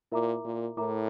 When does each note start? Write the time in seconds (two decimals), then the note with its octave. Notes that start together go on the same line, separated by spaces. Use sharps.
0.12 A#2 E4 A#4 E5 A#5 D6
0.45 A#2
0.77 A2 E4 A#4 E5 A#5 D6